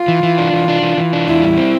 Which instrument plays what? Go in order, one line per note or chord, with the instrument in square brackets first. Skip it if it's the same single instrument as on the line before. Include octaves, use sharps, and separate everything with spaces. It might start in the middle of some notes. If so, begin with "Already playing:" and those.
Already playing: [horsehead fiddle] F4
[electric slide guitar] E3
E3
D4
E3
D4
E3
E3
D4
[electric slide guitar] E2 [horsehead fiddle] E4
[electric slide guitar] G3
C4